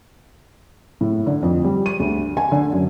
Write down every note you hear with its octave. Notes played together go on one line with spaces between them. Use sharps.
A2
D3
F2
G3
D#7
D2
G#5
D3
F#2